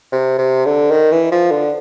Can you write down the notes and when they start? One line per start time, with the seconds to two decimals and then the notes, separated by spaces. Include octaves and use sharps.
0.12 C3
0.38 C3
0.65 D3
0.91 D#3
1.12 E3
1.32 F3
1.51 D3